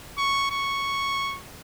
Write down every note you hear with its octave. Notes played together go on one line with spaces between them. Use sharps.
C#6
C#6